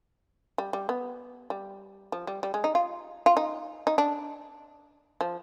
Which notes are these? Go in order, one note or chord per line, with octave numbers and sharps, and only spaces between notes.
G3
G3
B3
G3
F3
G3
G3
G#3
D#4
F4
F4
D#4
D#4
D4
F3